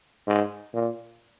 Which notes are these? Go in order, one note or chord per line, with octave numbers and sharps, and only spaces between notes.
G#2
A#2